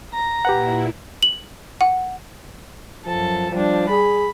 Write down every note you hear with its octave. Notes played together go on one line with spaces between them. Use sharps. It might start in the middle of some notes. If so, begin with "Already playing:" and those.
A#5
A#2 E4 G4 B4 F#5
F#7
F#5
F#2 F3 A4
F3 G3 D4
G#4 B5